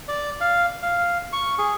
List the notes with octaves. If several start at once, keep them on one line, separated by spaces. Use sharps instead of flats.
D5
F5
F5
C#6
G#4